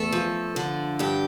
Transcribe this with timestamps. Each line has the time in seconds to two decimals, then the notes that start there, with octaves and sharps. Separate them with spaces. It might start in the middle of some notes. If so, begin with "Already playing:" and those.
Already playing: E2 A3 A4
0.13 F3
0.56 D3
0.99 G2 G4